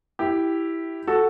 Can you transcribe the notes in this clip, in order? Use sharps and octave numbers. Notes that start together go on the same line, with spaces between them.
E4 G4
F#4 A4